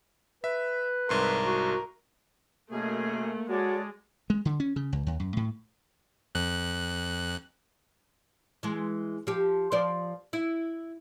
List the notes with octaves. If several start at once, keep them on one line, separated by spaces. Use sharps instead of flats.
B4 E5
C2 G#2 A#4 C6
F#4
F#2 B2 A3 A#3 G#4
G#3 F#4 A4 C#5 D5
G#3
D3
C#4
C#3
C#2
D#2
F#2
A2
F2 F#6
E3 G#3
F3 G4
F3 C5 D5
E4